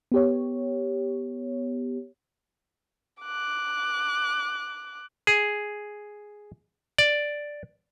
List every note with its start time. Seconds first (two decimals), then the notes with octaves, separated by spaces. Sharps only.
0.12 B3 G4 C#5
3.23 D6 F#6
5.27 G#4
6.98 D5